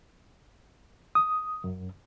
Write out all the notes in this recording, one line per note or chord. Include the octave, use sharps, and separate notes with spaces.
D#6
F#2